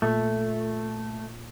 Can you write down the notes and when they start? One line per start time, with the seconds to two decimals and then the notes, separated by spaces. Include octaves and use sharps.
0.02 A#2 A3